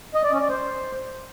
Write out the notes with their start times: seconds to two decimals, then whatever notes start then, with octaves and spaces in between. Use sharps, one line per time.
0.15 D#5
0.23 D5
0.32 C#4
0.41 D5
0.49 C5